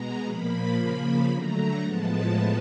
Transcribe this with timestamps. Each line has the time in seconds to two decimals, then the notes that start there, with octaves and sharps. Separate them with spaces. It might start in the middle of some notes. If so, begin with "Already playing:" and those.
Already playing: B2 G#3 B3 A#5
0.25 A#2 F3 A#3 B5
0.76 C#3 F3 A#3 B5
1.29 D3 F#3 A3 A#5
1.82 A2 F3 G#3 B3 A5